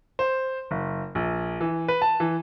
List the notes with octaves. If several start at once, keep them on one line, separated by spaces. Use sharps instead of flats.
C5
F#1
A#1
E3
B4
A5
E3